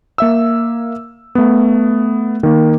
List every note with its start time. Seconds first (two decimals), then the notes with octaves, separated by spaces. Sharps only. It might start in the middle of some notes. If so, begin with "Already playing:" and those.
0.18 A#3 E5 E6
1.35 A3 B3
2.43 D#3 A#3